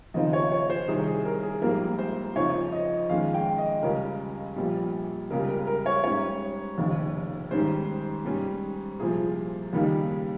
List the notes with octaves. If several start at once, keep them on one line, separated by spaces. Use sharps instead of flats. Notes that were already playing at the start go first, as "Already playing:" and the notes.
D#2 C#3 F3 C4 D#4 D#5
C#5
C#5
C5
C2 C3 D#3 G#4
G#4
A#4
G#4
A#1 G#2 G3 A#3 A#4
C5
F2 C#3 F3 C4 D#4 C#5
D#5
F2 D#3 G#3 C#4 F5
G5
D#5
C#2 C#3 G3 C#4 A#4
A#1 A#2 G3
C#2 C#3 G3 A#4
A#4
A#4
C#5
G#2 G3 C#4 C#5
F1 D#2 C#3
G#2 D#3 G3 C#4 C5
G#2 G3 C#4
C2 A#2 F3 G#4
D#2 C#3 G3 A#3 D#4